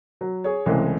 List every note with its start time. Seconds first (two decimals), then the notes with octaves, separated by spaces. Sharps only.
0.21 F#3
0.44 G#4 C#5
0.66 C2 C#3 E3 G#3 A3 C5